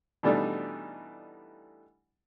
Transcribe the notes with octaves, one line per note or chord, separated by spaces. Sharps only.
B2 E3 G3 A3 D4 D#4